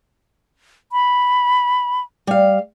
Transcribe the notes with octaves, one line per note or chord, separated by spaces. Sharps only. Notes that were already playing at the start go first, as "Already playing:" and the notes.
B5
G3 F5